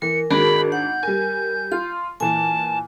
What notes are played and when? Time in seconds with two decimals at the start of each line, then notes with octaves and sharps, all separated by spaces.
0.02 E3 A#4 C#7
0.31 G#1 D4 F#4 G#4 A#4 B5 D7
0.72 F#5 G6
1.03 G3 A#4 G#5
1.72 F4 C6
2.20 A#2 E3 G#5 A5